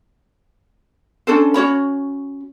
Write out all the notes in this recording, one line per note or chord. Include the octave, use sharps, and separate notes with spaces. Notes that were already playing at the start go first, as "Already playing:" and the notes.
C#4 D4 A4 C5
C#4 F#4 C#5 B5